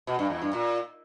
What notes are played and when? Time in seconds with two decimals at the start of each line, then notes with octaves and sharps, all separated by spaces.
0.07 B2
0.19 G2
0.30 E2
0.42 G2
0.53 A#2